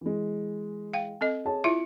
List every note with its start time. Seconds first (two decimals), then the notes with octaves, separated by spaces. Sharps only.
0.01 E3 G#3
0.93 F5 G5
1.21 C4 A4 D#5
1.45 G#4 C#5 A5
1.64 E4 F4 E5 C#7 D7